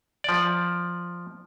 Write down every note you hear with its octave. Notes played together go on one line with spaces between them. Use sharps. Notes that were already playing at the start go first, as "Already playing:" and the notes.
F3 D5